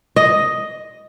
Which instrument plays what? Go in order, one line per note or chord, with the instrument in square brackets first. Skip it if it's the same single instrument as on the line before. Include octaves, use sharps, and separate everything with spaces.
[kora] D#5